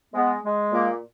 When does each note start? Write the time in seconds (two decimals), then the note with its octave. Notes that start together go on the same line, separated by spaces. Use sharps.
0.14 G#3 B3
0.43 G#3
0.72 A#2 A#3